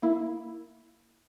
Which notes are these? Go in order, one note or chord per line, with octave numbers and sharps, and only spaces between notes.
A#3 E4